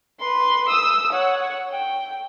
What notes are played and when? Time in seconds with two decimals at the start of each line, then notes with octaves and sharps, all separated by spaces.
0.20 B4 C6
0.69 D#6 E6
1.13 C#5 F#5
1.71 G5